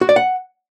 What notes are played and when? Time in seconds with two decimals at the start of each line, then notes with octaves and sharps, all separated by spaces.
0.01 F#4
0.09 D5
0.16 F#5